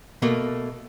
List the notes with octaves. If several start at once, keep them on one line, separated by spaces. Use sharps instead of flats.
B2 A3 A#3